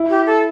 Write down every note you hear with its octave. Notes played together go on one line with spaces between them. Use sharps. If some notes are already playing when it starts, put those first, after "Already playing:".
Already playing: E4
G4
A4